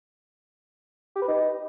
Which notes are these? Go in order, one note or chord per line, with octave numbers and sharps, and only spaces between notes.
G4
B4
D#4